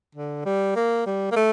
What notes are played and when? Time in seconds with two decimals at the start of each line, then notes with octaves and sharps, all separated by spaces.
0.15 D3
0.46 G3
0.76 A#3
1.06 G3
1.31 A#3
1.36 A3